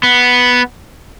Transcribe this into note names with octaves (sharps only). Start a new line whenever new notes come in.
B3